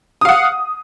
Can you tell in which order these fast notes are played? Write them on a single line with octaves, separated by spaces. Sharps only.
D#6 F5 F#5